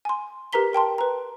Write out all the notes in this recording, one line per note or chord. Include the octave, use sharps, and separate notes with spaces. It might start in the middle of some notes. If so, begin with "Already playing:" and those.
G#5 C6
G4 A#4 B4 A#5 B6 G7
A#4 G5 A5 C6
B4 A#5